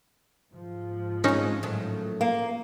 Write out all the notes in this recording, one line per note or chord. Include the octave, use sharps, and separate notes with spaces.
G#2 F3
G#3 C4 C#4 D#4
A2 D#3 F#3
A#3